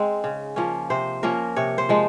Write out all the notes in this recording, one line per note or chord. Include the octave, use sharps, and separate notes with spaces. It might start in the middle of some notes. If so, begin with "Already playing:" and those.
Already playing: G#3 C4 D#4 G#4
C#3
F3 A#3 C#4
C3 C5
F3 A#3 C#4 A#4
C3 C#5
C5
F3 G#3 D#4